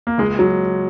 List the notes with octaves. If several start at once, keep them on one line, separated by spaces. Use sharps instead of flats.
A#3
C#2 G#3
F#3